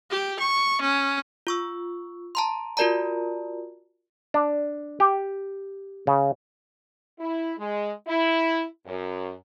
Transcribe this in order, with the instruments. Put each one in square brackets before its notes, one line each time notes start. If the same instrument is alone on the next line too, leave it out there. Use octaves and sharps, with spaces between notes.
[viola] G4
C#6
C#4
[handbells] F4 C#6 E6
A5 A#5 C6
F4 F#4 A#4 D5 A5 A#5
[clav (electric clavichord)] D4
G4
C#3
[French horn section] E4
G#3
E4
F#2